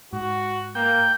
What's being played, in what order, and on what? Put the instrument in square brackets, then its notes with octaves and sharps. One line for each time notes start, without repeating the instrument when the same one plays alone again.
[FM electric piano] G#2 [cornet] F#4
[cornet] A#3 [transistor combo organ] G5